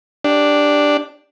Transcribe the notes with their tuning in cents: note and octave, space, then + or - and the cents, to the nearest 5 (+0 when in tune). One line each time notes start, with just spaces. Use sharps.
D4 +0 G4 +10